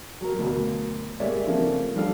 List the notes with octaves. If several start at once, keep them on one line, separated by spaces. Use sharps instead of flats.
F#3 A#4
D2 B2 F#3 A#3
G#3 A#3 G4 C#5 D5 E5
C#3 F3 A3 A#3 C4 C#4
F3 G3 D4 A4 F5